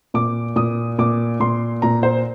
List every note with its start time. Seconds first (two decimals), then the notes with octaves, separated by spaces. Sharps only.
0.14 A#2 D6
0.56 A#2 D#6
0.99 A#2 D6
1.40 A#2 C6
1.82 A#2 A#5
2.03 C5